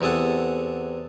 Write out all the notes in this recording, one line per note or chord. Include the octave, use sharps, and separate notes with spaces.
E2 C3 G#4 A4 F#5